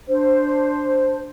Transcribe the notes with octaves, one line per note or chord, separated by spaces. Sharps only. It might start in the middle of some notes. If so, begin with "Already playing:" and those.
D4 C5